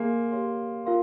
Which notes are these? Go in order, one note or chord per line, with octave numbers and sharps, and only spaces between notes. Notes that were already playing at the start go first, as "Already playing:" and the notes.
Already playing: A#3 G#4 E5 G#5 C6
G4 C#5 F5 C6
F4 A#4 F5 C6